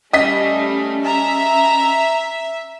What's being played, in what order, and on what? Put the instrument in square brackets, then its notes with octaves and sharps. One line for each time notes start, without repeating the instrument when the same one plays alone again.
[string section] G3 A3 [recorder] C#4 [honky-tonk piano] D#5 B6
[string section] E5 [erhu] A#5